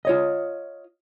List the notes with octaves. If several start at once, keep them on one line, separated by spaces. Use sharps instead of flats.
F4 C#5 D#5